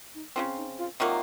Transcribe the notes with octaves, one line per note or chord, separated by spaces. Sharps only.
D#4
C#3 F3 C4 F4
D#4
F4
C3 D#3 F#3 A#3 F4